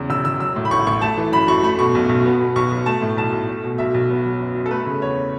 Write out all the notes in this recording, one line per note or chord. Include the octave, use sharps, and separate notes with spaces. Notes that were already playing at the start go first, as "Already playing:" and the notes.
Already playing: E2 C#3
E1 E6
E1 E6
F#3 E6
A2
B5
A1 C#6
A1 C#6
A3 A5
E3
F#2 B5
F#2 C#6
A3 B5
B2 C#6
B1
B1
B3
B2
B1 C#6
B1
A3 A5
A2
B1 A5
B1
A3
B2
B1 E5
B1
B3
F#3
F#2
F#2
A4
A3 B4
C#3
E2 C#5